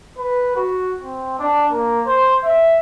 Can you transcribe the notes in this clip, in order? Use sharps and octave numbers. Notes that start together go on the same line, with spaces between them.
B4
F#4
C4
D4
A#3
C5
E5